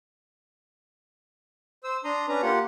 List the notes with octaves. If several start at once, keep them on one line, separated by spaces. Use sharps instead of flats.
C5 E6
D4 A#5 C6 D#6
C#4 D4 B4 A#5
A#3 F4 G4 F#5